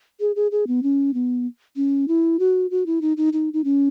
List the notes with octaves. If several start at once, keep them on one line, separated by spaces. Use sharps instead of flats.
G#4
G#4
G#4
B3
C#4
B3
C#4
E4
F#4
F#4
E4
D#4
D#4
D#4
D#4
C#4